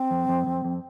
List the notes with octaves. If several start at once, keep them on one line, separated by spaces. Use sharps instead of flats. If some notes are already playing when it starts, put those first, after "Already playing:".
Already playing: C4
F2
F2
F2
F2